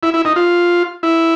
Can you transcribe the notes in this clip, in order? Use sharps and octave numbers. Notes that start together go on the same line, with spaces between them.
E4
E4
D#4
F4
E4